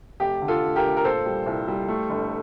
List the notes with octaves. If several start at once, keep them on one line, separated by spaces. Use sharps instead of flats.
F1 G4
D3
F4 A4
F1
G4 A#4
F1
A#4
A#2 A4 C5
G3
C2
G3
A3
G1